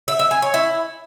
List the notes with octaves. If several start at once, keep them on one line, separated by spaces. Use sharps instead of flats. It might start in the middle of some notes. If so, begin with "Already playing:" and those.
E5
E5
G#5
C#5
E4